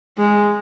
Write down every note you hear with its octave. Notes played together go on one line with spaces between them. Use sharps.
G#3